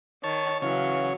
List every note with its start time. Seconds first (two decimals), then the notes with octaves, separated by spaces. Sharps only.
0.24 D#3 C#5 A5
0.62 C#3 E3 F#3 C#5 F5